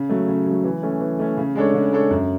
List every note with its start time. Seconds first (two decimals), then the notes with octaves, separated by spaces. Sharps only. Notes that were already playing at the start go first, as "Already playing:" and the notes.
Already playing: C#3
0.09 F#3 A3
0.28 C#3
0.46 F#3 A3
0.64 E3
0.83 A3 C#4
1.01 E3
1.19 A3 C#4
1.37 C#3
1.55 G#3 D4 A4 C#5
1.74 C#3
1.92 G#3 D4 A4 C#5
2.11 F#2